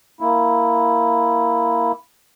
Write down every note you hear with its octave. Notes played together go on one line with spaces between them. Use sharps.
A#3 E4